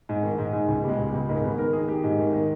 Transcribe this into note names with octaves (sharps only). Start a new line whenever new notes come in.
G#2
D#3
G#2
G#2
C#2 G#3
B2 G3
G#3
C#2
G3
C#2
G#2 A#3
D#3 B3
D#3 A#4
D#3 G#4
D#3 G4
G#2
D#3
D#3